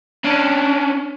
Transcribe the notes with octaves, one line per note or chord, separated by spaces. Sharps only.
C#4 D4